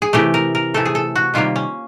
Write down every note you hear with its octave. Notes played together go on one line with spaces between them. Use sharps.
G#4
C3 E3 A3 G4
A#4
A#4
C3 E3 A3 A4
G#4
A4
F#4
C3 D#3 G3 A#3 F4
C#4